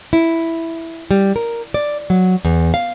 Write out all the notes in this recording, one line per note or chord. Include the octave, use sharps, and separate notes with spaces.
E4
G3
A#4
D5
F#3
E2
F5